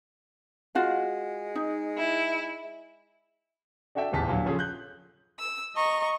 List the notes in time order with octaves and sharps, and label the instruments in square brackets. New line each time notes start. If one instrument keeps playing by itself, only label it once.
[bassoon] G#3 [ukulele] F4 F#4 F5
[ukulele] D#4
[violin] E4
[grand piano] D4 F#4 A4 E5 G5
D#1 A1 E2 A5 B6
A#2 D3 F#3
C#3 F3 C#4 F4 G#4 A4
F#6 G6
[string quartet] E6
D#5 A#5 C#6